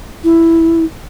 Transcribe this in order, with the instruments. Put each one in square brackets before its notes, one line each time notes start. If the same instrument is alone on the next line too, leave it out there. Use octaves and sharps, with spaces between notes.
[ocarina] E4